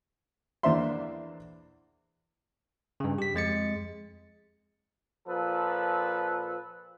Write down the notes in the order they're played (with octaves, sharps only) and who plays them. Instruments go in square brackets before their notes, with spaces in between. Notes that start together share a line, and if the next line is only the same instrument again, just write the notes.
[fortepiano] E2 A#3 D4 C5 E5 C6
[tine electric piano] G2 C#3
G4 B6
F2 G#3 A6 C#7
[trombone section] A#2 F3 A4 B4